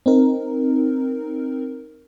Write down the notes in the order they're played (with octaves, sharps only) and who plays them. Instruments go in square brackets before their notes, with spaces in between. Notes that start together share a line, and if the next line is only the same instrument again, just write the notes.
[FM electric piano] C4 D#4 A#4